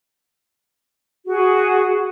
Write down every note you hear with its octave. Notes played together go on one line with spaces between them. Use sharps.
F#4 G#4